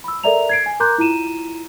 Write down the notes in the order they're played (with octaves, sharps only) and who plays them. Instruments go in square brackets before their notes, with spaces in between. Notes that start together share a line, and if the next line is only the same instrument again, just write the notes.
[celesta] B5 E6
A4 A#4 D5 E5 A#5 F7
G#6 C7 D7
G#5
A#4 A#5 C6 D6 F#6 G6
E4 F4 A#5 D#7 E7